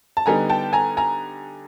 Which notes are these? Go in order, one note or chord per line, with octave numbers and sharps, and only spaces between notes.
A5
D3 G3 B3 D#4 G#5 A#5
G5 A5
G#5 A#5
G#5 A#5